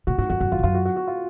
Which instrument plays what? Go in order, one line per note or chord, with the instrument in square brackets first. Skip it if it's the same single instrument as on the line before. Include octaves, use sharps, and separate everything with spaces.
[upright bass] A#2 [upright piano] F#4
[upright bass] G#2 [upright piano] F#4
[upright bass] F2 [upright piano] F#4
[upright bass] F#2 [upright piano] F#4
[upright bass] F2 [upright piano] F4
[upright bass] G#2
[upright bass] F#2 [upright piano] F4
[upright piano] F#4
F#4
F#4
F4